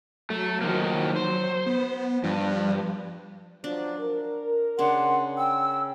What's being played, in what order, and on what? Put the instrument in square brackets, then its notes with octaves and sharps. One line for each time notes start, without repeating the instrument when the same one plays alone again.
[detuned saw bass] F#3 [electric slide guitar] A3
[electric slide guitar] D#3 F3 A#3
C5
[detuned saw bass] B3
[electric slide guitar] G2 [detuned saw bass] F3
[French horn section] F3 F#3 [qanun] D4
[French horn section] A#4
[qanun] C#3 D4 [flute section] F#5 [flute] C6
[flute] G5 [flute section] E6